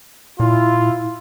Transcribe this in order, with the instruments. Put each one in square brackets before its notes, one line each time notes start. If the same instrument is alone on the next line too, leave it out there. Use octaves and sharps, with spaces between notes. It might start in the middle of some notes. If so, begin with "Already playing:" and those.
[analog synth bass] A#2 [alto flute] E4 [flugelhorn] F4